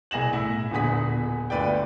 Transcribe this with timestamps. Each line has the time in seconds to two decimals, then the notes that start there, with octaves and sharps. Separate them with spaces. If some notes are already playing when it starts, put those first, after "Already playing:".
0.11 C2 G#4 A#6 E7 F#7
0.33 A2 E4
0.71 D#1 D3 B3 G#4 D#6 B6
1.50 G1 D2 B4 D5 G5